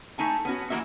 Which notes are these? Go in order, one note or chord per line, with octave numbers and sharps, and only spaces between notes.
A3 D#4 G#5 A5
B3 C#4 F#4
E3 G#3 A#3 F#4 E5